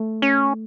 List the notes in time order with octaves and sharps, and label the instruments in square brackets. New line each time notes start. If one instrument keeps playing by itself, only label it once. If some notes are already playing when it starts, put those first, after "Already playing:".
Already playing: [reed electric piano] A3
[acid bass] C#4